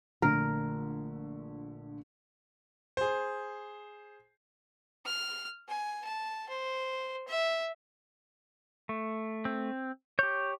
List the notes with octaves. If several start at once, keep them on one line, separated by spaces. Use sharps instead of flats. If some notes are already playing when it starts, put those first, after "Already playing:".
A#1 D3 A3 A#4
G#4 C5
F6
G#5
A5
C5
E5
A3
C4
G4 C#5 G6